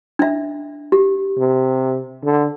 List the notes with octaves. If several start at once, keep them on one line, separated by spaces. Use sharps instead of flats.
D4 E5
G4
C3
D3